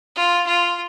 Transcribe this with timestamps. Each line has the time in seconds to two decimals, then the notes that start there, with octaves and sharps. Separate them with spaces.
0.16 F4
0.47 F4